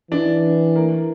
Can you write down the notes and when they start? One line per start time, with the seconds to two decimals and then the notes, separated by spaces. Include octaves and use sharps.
0.11 E3 D4
0.76 A#3